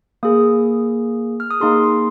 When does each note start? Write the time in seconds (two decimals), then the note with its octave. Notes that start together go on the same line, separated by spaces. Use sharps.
0.23 A#3 G#4 D#6
1.40 F6
1.51 D#6
1.61 A#3 D#4 G#4 C6
1.84 C6